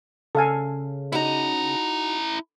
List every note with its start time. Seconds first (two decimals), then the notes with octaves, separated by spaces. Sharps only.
0.35 C#3 A4 F5 G#5
1.12 D#4 E4 F#4 A#5